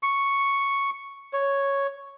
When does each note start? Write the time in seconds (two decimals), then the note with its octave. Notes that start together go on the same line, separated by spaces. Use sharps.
0.03 C#6
1.33 C#5